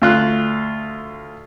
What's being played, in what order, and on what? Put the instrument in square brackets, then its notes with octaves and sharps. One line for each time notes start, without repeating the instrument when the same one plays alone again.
[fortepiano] D2 F4 F#6